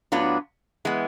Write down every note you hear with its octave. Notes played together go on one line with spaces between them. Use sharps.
A2 F#3 B3 D4 F4
E3 G#3 B3